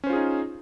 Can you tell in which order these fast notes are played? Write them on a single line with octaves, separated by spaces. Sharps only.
C#4 C5 F4 G#4 D#4